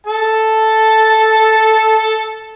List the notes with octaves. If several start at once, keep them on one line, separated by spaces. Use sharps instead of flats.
A4 A5